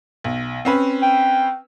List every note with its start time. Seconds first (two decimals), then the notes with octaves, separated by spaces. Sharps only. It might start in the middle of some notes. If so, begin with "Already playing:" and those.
0.24 B1
0.65 C4 C#4 B4
1.02 G5